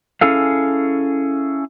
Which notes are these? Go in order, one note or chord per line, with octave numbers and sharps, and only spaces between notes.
C#4 E4 G#4 A4 F5